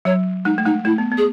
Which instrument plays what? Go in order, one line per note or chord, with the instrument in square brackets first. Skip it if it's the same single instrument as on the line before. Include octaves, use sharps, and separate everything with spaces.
[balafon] F#3 [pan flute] C#5
[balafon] G#3 [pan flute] D#4
[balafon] A3
[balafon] G#3 [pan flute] D#4
[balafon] A3 [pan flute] E4
[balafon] B3
B3
[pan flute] G#4